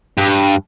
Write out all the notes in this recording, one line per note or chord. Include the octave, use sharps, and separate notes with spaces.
G2